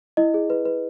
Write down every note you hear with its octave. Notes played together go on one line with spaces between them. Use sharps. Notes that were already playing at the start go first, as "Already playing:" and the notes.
E4 D#5
G#4
B4
B4